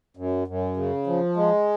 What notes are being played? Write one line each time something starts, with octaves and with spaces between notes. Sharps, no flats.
F#2
F#2
C#3
F3
G#3